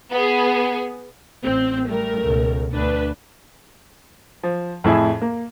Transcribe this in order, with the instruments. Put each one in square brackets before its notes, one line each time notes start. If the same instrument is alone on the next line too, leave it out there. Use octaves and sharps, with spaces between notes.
[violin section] B3 G#4
[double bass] A1 [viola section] C4
[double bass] G3 [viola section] A3 A#4
[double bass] C#2 B2
[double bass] D2 [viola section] D4 B4
[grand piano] F3
F2 A2 E4 G#4
A#3